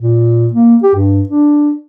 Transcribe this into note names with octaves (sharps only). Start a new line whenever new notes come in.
A#2
A#3
G4
G2
D4